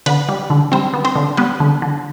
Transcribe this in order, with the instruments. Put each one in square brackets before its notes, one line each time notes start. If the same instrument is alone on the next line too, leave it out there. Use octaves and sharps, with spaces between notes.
[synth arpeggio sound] D3 B3 B4
G3
D3
G3 C4 C5
B3
C4 C5
D3
G3 B3 B4
D3
D3